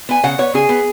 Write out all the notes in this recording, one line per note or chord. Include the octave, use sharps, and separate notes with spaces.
B3 G#5
C#3 F#5
B3 C#5
C#3 G#4
B3